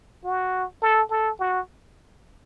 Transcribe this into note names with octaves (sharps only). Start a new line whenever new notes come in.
F#4
A4
A4
F#4